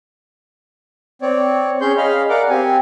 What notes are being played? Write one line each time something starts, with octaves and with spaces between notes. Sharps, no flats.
C4 C#5 D5
C#4 G#4 C#5 C6 G6
G#4 D#5 F5 B5 F6
A#4 D5 F5 F#5 D6
C4 G4 G#5